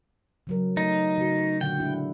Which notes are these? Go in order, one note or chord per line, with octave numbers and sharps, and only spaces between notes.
C#3 F#3 A#4
A3 D#4
C#3 F#4
A#2 D3 F#5 G5
G#3 D4 E4